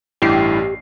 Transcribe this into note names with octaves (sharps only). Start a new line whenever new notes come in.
A1 G2 E4 G4 C7